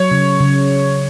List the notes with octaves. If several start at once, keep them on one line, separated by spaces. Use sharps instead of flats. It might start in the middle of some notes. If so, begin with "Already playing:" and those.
Already playing: F#3 C#5
C#3
C#3